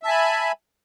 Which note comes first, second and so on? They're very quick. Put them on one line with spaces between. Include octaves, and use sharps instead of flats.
E5 A5 G#5 B5